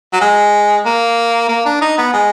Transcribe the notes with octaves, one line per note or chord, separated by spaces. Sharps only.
F#3
G#3
A#3
A#3
D4
D#4
B3
G#3